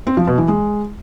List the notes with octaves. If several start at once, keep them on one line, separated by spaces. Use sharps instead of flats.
C4
F3
B2
E3
G#3